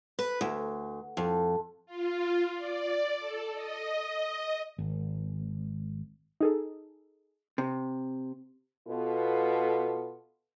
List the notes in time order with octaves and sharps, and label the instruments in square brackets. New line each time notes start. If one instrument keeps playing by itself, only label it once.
[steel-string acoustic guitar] B4
D2
F2
[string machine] F4
D5
A4
D#5
[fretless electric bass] G#1
[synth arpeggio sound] D#4 G#4 A4
[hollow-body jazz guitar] C3
[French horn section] B2 B3 F4 A4